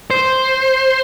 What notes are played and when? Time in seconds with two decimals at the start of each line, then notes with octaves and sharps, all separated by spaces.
0.11 C5